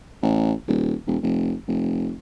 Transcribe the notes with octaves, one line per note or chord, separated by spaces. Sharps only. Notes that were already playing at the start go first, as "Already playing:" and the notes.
A1
D#1
E1
F1
F1